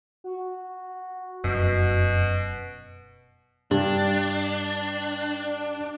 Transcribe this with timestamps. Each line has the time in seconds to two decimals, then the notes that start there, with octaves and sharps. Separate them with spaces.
0.24 F#4
1.44 F1 F#2 B2
3.71 G2 D4